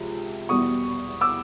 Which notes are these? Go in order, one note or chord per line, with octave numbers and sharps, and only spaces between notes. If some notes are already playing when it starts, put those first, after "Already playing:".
Already playing: C#2 C3 F3
E1 E2 B2 G3 C#6 D#6
D6 E6